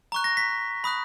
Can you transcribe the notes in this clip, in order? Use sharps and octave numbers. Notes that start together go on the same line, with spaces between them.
A#5 C#6 F#6
A#6
B6
B5 D#6 F#6